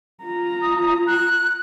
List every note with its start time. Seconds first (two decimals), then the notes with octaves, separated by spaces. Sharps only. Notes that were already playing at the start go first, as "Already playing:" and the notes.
0.24 F4 A#5
0.62 D#6
1.07 F#6